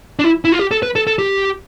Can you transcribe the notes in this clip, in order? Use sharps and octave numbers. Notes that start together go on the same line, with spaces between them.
D4
E4
E4
F4
G4
A4
B4
A4
A4
G4